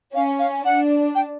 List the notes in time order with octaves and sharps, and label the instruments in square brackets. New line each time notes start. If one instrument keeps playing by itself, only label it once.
[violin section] C#4 [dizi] F5
[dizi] F5
[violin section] D4 [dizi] F#5
[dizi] G5